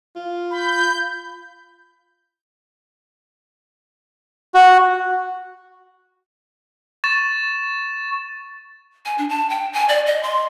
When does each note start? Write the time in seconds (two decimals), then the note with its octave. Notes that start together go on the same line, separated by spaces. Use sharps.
0.16 F4
0.51 B5 G6
4.54 F#4
7.04 C#6 A6 E7
9.05 G#5
9.18 D4
9.29 A5
9.50 G5
9.73 G#5
9.89 D5
10.07 D#5
10.23 C6